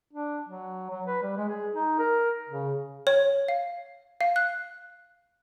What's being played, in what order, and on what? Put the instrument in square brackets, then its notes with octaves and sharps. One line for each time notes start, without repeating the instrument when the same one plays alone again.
[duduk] D4
F#3
F#3
B4
G3
G#3
G#4
D#4
A#4
C#3
[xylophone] C#5
F5
F5
F#6